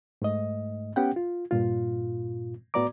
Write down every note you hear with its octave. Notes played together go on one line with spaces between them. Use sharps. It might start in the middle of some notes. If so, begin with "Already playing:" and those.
G#2 A3 D#5
B3 C#4 G4 F#5 G5
F4
G2 A#2 F4
A2 B3 F#4 D5 A#5 D6